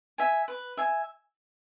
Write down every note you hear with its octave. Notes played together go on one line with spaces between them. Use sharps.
E5 G#5
B4
E5 G#5